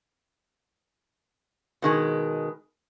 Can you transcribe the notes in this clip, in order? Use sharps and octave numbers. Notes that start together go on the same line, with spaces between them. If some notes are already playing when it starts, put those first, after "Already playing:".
B2 D#3 G#3